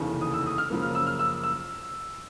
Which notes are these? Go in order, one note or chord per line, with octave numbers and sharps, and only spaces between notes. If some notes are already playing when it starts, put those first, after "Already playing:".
Already playing: F1 D#2 C#3 E3
D#6
E6
D#6
F6
F#2 C#3 F3 A#3
F6
E6
F6
E6
E6